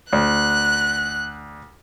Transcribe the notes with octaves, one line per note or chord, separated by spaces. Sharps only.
D2 F#6